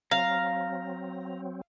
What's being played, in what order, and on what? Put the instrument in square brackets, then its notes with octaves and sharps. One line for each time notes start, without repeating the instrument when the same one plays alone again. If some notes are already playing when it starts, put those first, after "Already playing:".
[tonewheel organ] F#3 C4 [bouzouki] F5 [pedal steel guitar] A#5